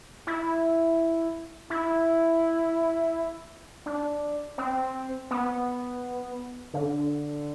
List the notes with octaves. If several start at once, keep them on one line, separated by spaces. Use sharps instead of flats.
E4
E4
D4
C4
B3
D3